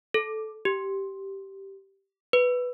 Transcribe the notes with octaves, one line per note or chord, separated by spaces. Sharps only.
A4
G4
B4